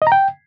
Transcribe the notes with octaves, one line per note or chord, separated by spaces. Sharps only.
D#5
A#5
G5